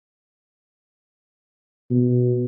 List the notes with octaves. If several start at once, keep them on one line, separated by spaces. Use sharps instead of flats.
B2